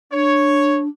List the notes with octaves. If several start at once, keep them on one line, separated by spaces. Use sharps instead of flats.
D4 C#5